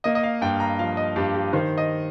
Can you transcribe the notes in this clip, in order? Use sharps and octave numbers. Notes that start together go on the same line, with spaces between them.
A#3 D#5
D#5
F5
G2 G5
A#5
F3 F5
D#5
G2 G4
G4
D#3 C5
D#5